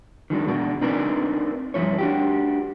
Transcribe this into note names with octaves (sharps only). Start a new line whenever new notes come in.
D#3 F#3 G#3 D4
B2 G#3 D4 F#4
C4 D4 D#4 A#4 B4 D5
G2 D#3 F3 E4 C#5
D4 F#4 G4